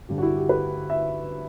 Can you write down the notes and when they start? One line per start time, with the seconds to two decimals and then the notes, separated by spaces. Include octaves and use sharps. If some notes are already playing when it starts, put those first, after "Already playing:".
0.09 G2 D3 G4
0.18 F#4
0.23 E4
0.36 G4
0.49 B4
0.90 E5